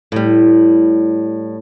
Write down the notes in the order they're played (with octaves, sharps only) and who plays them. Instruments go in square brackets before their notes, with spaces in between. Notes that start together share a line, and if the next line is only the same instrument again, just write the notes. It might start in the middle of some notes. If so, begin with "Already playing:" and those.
[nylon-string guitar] A2 G3